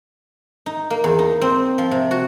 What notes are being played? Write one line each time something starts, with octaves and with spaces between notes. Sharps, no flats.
D#4
A#3
E2
D#4
C4
F3
C3
F#4